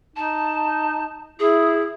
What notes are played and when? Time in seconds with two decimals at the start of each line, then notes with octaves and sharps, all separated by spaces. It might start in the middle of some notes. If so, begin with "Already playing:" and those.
0.16 D#4 A5
1.40 E4 G#4